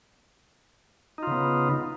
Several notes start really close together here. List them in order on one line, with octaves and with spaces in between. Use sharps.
D#4 F4 C#3 B3